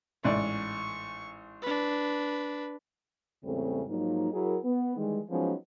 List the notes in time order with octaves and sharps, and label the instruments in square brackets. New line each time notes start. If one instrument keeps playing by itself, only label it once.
[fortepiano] A1 G#2 D5 [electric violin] C#6
[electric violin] D4 B4
[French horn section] E2 G#2 C#3 G3 A3 C4
G#2 F3 F#3 A#3 D#4
F#3 E4 F#4 G#4 A#4
B3
D#3 E3 G3 G#3
F3 F#3 G#3 B3 C#4 D#4